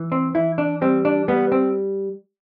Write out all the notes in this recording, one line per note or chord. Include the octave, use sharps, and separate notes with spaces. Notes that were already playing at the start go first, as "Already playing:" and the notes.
Already playing: E3
C4
E3 E4
D4
G3 C4
D4
G3 B3
C4